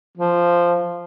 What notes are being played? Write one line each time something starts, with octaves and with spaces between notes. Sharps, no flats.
F3